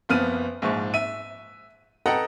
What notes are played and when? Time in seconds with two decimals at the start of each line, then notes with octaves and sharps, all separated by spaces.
0.09 F#1 F3 B3 C4 F6 D#7
0.62 A#1 G#2 F3 C#6
0.94 E5 D#7
2.06 A4 B4 D#5 F#5 G5 A#5